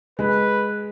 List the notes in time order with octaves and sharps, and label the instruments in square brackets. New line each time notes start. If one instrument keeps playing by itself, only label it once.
[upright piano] G#3 [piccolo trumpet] B4